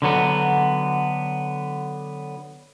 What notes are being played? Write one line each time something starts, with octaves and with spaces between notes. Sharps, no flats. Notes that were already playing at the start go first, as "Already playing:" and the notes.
D3 F#3 B3